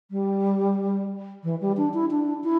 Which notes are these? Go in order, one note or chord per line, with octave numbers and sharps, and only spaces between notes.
G3
E3
G3
D4
E4
D4
E4